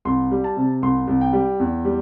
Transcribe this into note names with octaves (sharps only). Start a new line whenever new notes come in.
C2 C6
G3
A5
C3
C2 C6
C2
G5
G3
E2
G3